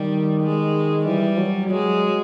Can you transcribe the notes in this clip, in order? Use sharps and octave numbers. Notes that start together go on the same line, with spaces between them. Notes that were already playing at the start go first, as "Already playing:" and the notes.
Already playing: D#3 G3
G#3
E3 G3
F#3
F#3 G#3